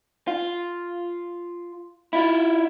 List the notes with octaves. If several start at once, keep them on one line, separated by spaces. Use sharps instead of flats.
F4
E4 F4